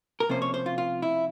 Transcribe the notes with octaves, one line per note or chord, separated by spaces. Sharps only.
A#4
C3 F3 A#3 C#4 C5
C#5
C5
F4
F4
E4